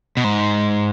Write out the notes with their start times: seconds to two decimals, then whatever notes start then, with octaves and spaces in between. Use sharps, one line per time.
0.17 B2
0.24 G#2